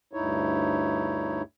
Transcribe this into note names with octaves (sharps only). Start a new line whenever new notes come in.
D2 G2 D#4 E4 C#5